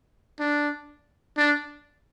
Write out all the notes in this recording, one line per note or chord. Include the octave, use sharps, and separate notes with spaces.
D4
D4